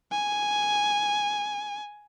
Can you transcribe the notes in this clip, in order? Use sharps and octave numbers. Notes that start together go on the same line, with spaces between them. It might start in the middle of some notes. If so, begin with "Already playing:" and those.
G#5